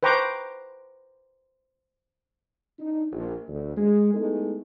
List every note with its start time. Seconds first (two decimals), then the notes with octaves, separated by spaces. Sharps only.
0.03 B4 C5 G5 A#5 C#6 D6
2.79 D4 D#4
3.12 A#1
3.48 D2
3.77 G#3
4.14 G#3 A3 B3 D#4 E4 A4